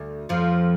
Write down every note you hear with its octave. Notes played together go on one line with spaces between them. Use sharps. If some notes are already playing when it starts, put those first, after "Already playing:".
Already playing: D2
F2 F3